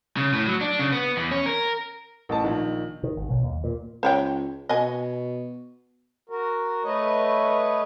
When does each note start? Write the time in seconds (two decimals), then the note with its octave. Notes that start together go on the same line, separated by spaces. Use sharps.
0.17 C#3
0.33 A2
0.47 F#3
0.61 D4
0.79 C#3
0.92 B3
1.17 E2
1.31 C#4
1.46 A#4
2.29 A1 A5
2.44 A#1 D#3
3.03 D#3
3.17 G#1
3.29 B1
3.43 D#2
3.64 A#2
4.03 C#2 C5 C#5 G5
4.69 B2 D#5 G#5
6.29 F#4 A#4
6.84 A3 B4 C#5 D#5